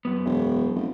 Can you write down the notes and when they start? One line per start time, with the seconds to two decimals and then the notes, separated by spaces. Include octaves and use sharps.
0.05 F#2 B3
0.25 E1
0.74 F1